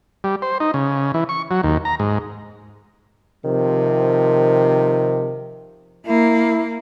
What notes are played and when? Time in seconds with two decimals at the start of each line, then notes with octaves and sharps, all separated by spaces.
0.24 G3
0.42 C5
0.60 D#4
0.74 C#3
1.14 E3
1.29 C#6
1.51 F#3
1.63 D#2
1.85 A#5
2.00 G#2
3.44 C3 D#3 F3
6.07 A#3 E4